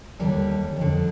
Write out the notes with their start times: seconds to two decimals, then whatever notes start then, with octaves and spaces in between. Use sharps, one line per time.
0.19 D#2 D3 G3
0.76 F2 D3